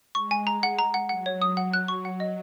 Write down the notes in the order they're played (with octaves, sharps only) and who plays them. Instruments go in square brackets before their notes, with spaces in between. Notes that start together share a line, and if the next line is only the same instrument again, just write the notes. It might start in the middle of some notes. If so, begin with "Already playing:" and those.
[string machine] G#3 [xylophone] C#6
[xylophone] G#5
A#5
F#5
A#5
F#5
[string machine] F#3 [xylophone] F#5
[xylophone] C#5
D#6
F#5
[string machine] F#3 [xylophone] F#6
[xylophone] C#6
F#5
D#5